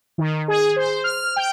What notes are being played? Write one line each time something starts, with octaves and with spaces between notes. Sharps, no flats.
D#3
G#4
C5
F6
G5